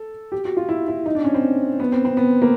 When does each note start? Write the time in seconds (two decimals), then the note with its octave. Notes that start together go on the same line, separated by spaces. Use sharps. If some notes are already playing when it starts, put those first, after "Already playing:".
Already playing: A4
0.32 G4
0.45 F#4
0.57 F4
0.69 E4
0.88 E4
1.06 D#4
1.15 D4
1.24 C#4
1.34 C4
1.80 B3
1.92 C4
2.05 C4
2.17 B3
2.42 A#3